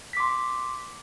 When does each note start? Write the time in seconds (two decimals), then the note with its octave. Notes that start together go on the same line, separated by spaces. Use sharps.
0.13 B6
0.17 D6
0.20 C6